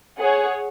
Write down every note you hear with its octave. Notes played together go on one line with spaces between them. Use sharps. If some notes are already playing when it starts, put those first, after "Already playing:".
G#4 C#5 F#5